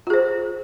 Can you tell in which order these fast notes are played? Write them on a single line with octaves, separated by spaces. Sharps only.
F4 G#4 C5